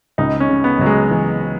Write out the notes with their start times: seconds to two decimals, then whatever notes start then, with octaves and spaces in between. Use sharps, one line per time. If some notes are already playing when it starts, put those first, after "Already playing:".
0.18 C#2 D#4
0.40 C#4
0.49 C#3
0.64 B3
0.79 C#2 F#3
0.86 G#3
1.10 E3